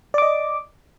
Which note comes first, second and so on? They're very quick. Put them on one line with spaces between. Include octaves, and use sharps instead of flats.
D5 D6 D#5